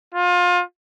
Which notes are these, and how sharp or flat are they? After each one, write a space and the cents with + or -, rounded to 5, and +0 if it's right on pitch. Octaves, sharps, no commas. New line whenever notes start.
F4 +30